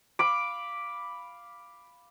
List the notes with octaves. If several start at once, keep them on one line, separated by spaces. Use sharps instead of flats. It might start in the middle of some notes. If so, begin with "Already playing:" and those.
F5 B5 D6